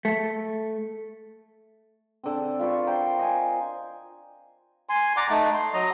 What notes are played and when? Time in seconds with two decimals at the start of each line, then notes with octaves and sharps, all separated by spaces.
0.05 A3
2.23 D3 C4
2.59 F4 B4 D5 C#6
2.86 A#4 C5 G5
3.19 D#5 G#5
4.89 G#5 C6
5.17 D5 F#5 A#5 D6
5.30 A3 D#4
5.54 C6
5.74 F#3 D#5 A#5